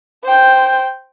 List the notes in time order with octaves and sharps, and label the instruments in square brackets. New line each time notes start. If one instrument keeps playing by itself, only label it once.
[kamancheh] C5 G5